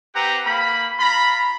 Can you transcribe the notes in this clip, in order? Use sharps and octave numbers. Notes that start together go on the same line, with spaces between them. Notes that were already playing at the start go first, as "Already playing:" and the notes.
C4 G4 B4 F#5 A#5
A#3 B5
F4 A#5 B5